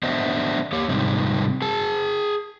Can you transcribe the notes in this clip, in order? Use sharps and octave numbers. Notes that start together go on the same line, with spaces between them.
B3 D4 C5 D#5 E5
A#3 G4 C#5
G#2 C3 G3 C4 D#4
G#4 A5